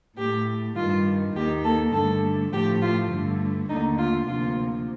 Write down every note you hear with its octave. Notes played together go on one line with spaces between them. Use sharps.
A2 A3 G4
G2 D#3 G3 F4
D#2 D#3 A#3 G4
A4
G2 D3 A3 A4
A2 F3 A3 G4
F4
G2 D3 A3
D#2 D3 A3 D#4
F4
D2 C3 F3 A#3 F4